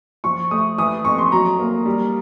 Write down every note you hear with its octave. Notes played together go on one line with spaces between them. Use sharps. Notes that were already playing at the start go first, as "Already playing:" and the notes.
F3 C#6
A3 D#6
E3 D#6
F2 C#6
C6
F#3 A#5
A#3
G3